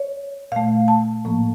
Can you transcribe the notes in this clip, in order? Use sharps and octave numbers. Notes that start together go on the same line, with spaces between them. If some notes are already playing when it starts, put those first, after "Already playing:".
Already playing: C#5
A#2 A3 F5
A5
A2 F3 A#3